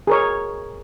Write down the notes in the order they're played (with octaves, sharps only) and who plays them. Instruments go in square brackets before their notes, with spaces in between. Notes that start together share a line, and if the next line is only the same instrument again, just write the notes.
[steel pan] G#4 A#4 C#5